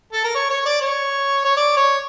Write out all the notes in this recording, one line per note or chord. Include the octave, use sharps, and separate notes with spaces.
A4
A#4
C#5
C#5
D5
C#5
C#5
D5
C#5